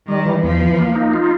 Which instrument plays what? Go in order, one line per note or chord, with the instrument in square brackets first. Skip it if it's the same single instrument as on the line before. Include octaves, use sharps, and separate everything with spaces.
[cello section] D#3 [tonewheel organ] G3
[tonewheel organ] E3
[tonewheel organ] E2 [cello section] F3
[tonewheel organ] E3
A#3
D#4
F4